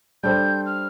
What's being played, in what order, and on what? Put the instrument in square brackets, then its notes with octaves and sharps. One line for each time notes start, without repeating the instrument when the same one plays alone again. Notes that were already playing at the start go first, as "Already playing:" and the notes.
[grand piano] G3 D4 A4 C5 [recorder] G6
[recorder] F6